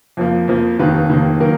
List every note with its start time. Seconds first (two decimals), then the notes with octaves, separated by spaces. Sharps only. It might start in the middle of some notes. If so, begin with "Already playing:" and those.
0.17 F2 F3 A#3
0.48 F2 F3 A#3
0.79 F1 D#2 D#3 A#3 B4
1.09 F1 D#2 D#3 A#3
1.40 D#3 F#3 A#3 A#4